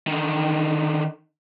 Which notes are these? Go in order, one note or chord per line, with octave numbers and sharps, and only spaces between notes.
D3 D#3